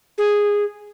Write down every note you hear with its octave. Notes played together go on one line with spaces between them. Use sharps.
G#4